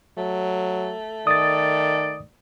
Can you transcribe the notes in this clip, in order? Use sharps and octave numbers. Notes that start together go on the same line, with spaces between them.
F#3 A3
D#3 D5 D#6 A6